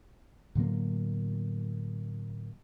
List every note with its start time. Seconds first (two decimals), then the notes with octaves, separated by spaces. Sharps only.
0.55 A2 D3 F#3 A#3